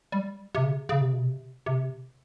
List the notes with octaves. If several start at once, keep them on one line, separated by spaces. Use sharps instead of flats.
G3
C3
C#3
C#3
C3
B2
C3
C3